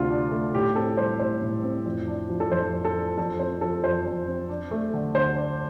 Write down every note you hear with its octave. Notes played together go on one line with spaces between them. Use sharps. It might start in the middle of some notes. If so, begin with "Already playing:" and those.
Already playing: D2 C3 A3 F4
D4
A3
A2 G4
C4 A4
G3 C5
A2 C5
A2
C4
F2
D4
F3
A4
F2 C5
F2
A4
D4
F2 A4
C4 C5
F3 A4
F2 C5
F2
C4
D4
A3
D3
D2 C5
D4